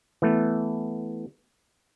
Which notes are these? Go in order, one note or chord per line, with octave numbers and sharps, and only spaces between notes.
E3 A3 B3